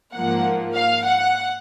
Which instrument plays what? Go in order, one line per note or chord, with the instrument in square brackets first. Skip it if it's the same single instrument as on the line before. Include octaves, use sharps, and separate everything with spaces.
[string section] G#2 F3 A#3 F#5
F5
F#5